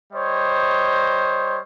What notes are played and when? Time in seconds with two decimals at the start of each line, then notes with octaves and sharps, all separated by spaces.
0.13 G3 C5 C#5 D#5